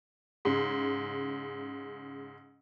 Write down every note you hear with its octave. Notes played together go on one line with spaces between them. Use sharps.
G#2 C#3